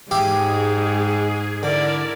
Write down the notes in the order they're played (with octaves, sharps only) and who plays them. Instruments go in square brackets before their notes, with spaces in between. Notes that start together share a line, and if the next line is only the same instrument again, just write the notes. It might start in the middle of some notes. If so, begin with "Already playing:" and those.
[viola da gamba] G#2 G#3 [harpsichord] G4 E5 F5 [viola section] G#4
[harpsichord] D3 [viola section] E4 A#4 D5